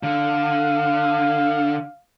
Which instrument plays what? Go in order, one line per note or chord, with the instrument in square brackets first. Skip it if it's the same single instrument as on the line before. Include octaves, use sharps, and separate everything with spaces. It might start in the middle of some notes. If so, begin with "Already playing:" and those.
[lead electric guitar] D3 [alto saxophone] F5